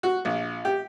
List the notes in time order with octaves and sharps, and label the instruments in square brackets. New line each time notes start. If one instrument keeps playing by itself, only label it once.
[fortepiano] F#4
A#1
G4